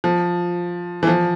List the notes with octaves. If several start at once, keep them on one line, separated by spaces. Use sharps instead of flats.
F3
E3
F3